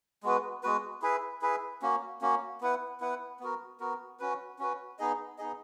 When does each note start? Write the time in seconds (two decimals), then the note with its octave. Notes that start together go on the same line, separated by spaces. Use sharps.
0.23 G#3 B3 F#4 B4
0.63 G#3 B3 F#4 B4
1.02 E4 G#4 B4 E5
1.42 E4 G#4 B4 E5
1.82 A#3 C#4 F#4
2.22 A#3 C#4 F#4
2.61 B3 E4 B4 F#5
3.00 B3 E4 B4 F#5
3.40 B3 F#4 A#4
3.80 B3 F#4 A#4
4.20 C#4 F#4 B4
4.59 C#4 F#4 B4
4.99 B3 D#4 G#4 D#5
5.38 B3 D#4 G#4 D#5